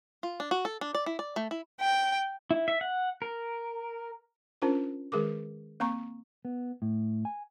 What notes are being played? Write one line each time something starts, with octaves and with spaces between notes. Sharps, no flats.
F4
D4
F#4
A4
D4
D5
E4
D5
A3
E4
G5
E4
E5
F#5
A#4
C#4 D4 F4 A#4 C5
D#3 G#3 G#4 A#4 D6
A#3 C4 A#5 C#6
B3
A2
G#5